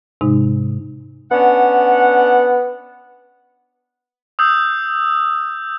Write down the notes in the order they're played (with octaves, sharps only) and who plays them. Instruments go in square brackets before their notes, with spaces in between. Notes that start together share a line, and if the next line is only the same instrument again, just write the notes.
[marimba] G#2 C3 G#3 D#4
[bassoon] B3 [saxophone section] C#4 D4 F#5
[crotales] D#6 E6 G6